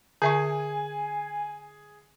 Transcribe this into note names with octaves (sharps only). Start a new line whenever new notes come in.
D3 G#4 E5 G#5 C#6